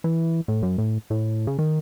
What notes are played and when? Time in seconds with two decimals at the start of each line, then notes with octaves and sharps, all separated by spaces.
0.04 E3
0.48 A2
0.62 F#2
0.78 A2
1.10 A2
1.47 C#3
1.59 D#3